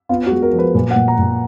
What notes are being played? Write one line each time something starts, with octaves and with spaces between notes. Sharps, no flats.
B3 F4
F#4
G#3
A#4
F3
B4
A#2 B4
F#5
A#2
A#5
A#2